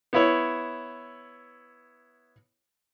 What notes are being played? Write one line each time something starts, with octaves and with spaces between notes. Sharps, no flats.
B3 E4 C#5